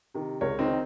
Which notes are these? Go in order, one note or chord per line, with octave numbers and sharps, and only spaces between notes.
C3 D#3
C#2 A#4 C#5
C4 D#4
D#3